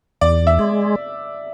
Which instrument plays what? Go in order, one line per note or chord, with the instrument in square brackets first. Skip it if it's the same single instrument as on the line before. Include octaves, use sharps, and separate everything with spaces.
[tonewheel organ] E2 [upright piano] D5
[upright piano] E5
[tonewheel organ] G#3